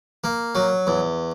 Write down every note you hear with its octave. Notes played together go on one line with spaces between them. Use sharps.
A#3
F#3
E2